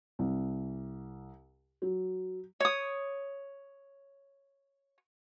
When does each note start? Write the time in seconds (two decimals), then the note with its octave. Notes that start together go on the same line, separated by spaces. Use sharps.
0.19 C2
1.82 F#3
2.60 C#5 D#6